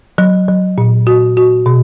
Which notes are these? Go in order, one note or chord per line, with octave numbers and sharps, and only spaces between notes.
F#3
F#3
A#2
F#4
F#4
B2